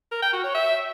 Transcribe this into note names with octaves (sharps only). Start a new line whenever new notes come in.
A#4
G5
F#4
C#5
E5